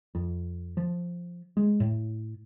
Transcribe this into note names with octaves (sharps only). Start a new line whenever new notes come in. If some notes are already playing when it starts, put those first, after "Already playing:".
F2
F3
G#3
A2